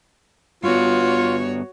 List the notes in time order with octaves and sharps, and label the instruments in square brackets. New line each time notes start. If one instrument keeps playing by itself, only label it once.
[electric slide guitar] G2 B3 [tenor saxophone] F4 [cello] F#4 C#5